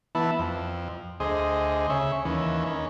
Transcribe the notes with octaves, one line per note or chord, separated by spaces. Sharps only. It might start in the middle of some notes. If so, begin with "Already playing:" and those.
E3 B3 E4 A5
F2
D2 G#4 C5 D#5
C#3 C#5 E5
D#2 E3 C#4
D#3 C#4